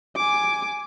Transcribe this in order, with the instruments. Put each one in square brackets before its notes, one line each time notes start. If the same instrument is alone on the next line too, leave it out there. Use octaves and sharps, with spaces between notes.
[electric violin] G#5 D6